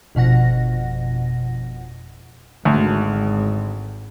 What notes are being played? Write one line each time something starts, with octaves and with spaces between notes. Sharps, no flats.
G1 F2 B2 F#5 A#6
G#1 D2